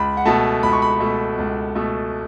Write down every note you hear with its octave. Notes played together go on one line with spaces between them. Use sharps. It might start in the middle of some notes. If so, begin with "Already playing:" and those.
Already playing: C#2 B5
F#5
B2 A3 A5
C#2 B5
C#6
B5
B2 A3
C#2
B2 A3